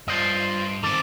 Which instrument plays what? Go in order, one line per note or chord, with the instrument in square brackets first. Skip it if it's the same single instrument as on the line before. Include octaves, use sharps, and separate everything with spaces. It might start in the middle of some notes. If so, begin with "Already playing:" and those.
[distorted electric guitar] G2 D5 [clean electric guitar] F4 C5 D#5
[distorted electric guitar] D#3 C4 [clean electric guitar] A4 [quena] D6